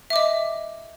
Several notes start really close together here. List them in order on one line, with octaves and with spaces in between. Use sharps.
E5 D6 D#5